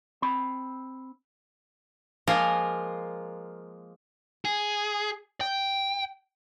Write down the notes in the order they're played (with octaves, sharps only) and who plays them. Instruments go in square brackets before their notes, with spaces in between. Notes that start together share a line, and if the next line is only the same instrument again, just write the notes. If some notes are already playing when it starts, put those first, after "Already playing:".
[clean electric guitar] C4 B5
[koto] F3 G#3 A#3 F4 A#4
[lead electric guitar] G#4
G5